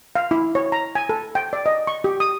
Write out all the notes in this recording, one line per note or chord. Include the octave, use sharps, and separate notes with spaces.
F5
E4
C#5
A#5
G#5
A4
G5
D5
D#5
C#6
G4
D#6